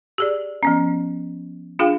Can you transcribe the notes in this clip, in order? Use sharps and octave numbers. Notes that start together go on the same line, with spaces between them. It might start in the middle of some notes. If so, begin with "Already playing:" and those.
G4 G#4 D5
F3 B3 C#4
D4 F4 G#4 F5 G5